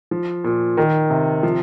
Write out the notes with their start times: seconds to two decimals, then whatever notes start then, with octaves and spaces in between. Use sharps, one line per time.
0.11 F3
0.44 A#2
0.77 D#3
1.10 C3
1.43 F3